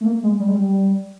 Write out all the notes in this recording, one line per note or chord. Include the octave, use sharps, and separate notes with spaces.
A3
A#3
G#3
G3
G#3
G3